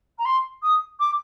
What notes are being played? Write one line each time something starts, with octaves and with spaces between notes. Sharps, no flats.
A#5
C6
D#6
D6